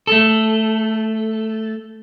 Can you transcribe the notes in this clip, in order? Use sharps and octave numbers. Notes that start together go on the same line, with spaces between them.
A3 A4